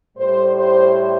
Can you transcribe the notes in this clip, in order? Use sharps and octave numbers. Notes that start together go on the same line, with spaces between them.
A2 G3 C5
C5